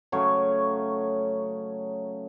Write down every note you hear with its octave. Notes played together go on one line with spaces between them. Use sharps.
C#3 F#3 A3 C#5